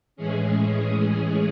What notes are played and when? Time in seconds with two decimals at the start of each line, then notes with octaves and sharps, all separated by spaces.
0.16 A2 E3 G#3 C#4 G#4